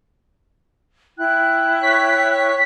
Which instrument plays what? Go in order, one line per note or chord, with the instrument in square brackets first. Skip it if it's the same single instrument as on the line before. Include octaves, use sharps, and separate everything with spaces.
[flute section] E4 G5 F#6
[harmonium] C#5 [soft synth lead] B6